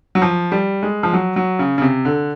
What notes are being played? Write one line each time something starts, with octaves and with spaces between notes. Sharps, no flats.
F#3
F3
G3
G#3
F3
F#3
F#3
C#3
C#3
C3
D3